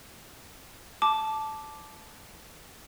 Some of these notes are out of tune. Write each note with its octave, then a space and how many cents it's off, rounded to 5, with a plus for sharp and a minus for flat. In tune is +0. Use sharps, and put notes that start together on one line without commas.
A5 -10 D6 +0